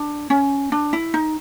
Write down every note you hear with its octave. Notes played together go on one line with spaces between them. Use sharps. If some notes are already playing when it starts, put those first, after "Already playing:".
Already playing: D4
C#4
D4
E4
D#4